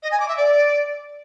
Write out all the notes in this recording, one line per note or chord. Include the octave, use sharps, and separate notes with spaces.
D#5
G#5
D6
E5
D5